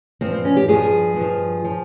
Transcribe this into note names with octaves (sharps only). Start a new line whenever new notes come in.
G2 F3 C4
C4
C#4
G4
G2 F3 G#4
G2 F3
F3